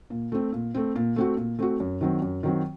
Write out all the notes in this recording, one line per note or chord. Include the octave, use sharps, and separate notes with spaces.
A#2
A3 C4
A#2
A3 C4
A#2
A3 C4 F#4
A#2
A3 C4 F#4
F#2
D#3 F#3 C4
F#2
D#3 F#3 C4